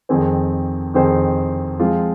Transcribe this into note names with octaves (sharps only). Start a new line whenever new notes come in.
F2 D#3 C4 G#4 C5
F2 D#3 C4 G#4 C5
F3 G#3 C4 F4